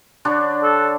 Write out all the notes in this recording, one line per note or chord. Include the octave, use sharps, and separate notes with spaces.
D3 D4 C#5
A4